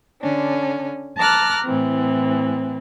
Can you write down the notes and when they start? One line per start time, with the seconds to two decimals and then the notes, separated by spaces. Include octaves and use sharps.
0.21 D3 C#4 D4
1.17 A5 A#5 D6 F6 F#6
1.64 A2 E3 C4